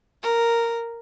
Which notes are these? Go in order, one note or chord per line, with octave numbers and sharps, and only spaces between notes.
A#4